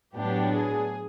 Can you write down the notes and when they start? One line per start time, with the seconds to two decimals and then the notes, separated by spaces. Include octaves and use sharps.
0.15 A2 F#3 B3 D4 G4
0.53 G#4